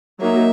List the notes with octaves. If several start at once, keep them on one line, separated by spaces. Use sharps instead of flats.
F#3 A#3 D#4 E5